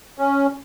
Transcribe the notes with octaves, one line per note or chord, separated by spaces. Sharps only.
C#4